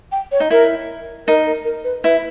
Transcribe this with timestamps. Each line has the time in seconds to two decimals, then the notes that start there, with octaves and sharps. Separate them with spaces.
0.12 G5
0.32 C#5
0.40 D#4
0.50 E4 A#4
1.27 D#4 A#4
1.47 A#4
1.65 A#4
1.84 B4
2.04 E4 B4